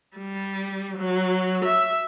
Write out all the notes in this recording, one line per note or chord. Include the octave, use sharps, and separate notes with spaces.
G3
F#3
E5